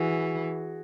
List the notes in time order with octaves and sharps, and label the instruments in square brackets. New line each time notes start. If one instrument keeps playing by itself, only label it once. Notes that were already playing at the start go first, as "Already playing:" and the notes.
Already playing: [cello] E3 [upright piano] F#4 G#4